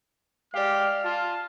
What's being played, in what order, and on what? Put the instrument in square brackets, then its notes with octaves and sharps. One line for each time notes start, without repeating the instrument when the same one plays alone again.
[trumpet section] G#3 G4 [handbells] D5 F5 [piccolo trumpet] F6
[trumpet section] F4 [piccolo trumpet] A5